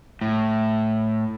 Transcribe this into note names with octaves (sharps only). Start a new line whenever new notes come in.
A2